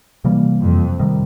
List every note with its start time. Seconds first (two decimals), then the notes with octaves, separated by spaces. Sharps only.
0.24 C3 E3 G3 A#3
0.62 F2
0.99 C3 D#3 G3